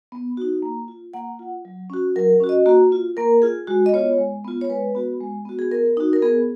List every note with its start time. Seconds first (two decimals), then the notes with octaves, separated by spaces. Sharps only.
0.12 B3
0.37 D#4 F#4
0.62 A#3
0.88 F4
1.14 A#3 F#5
1.39 F4
1.65 F#3
1.90 C#4 F#4
2.16 F#3 A#4
2.40 C#4 F#4
2.49 D#5
2.66 A#3 F#4
2.92 F4
3.17 A#3 A#4
3.42 F4 G#4
3.67 G#3 F#4
3.86 D#5
3.93 B3 F4 C#5
4.18 G#3
4.45 B3 F4
4.61 C#5
4.70 G#3 B4
4.95 B3 F#4
5.21 G#3
5.45 B3 F#4
5.59 G#4
5.71 B3 A#4
5.97 D#4 F#4
6.13 A#4
6.22 B3 G#4